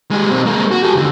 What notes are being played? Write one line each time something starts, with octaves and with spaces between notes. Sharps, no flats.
G#3 G4
B1 C4
G#3 A#3
F#4
G4 A4
D#2 D3